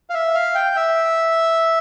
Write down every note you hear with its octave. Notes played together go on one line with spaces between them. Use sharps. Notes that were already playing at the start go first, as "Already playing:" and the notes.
F5
E5
F5
G5
E5